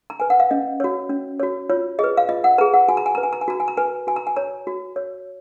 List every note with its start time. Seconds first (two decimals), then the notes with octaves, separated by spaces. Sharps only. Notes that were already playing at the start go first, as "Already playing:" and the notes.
0.10 A#5
0.20 B4 G#5
0.30 F#5
0.40 F5
0.51 C#4 D#5
0.80 F#4 C#5
1.10 C#4
1.40 F#4 C#5
1.70 F4 C#5
1.99 G#4 B4 D#5
2.17 F5
2.29 F4 D#5
2.44 F#5
2.58 G#4 B4 A#5
2.74 F#5
2.88 F#4 G#5
2.97 A#5
3.06 G#5
3.15 B4 A#5
3.23 G#5
3.33 A#5
3.41 G#5
3.48 F#4 A#5
3.60 G#5
3.68 A#5
3.77 B4 G#5
4.07 F#4 G#5
4.16 A#5
4.27 G#5
4.36 C#5 A#5
4.67 F#4
4.96 C#5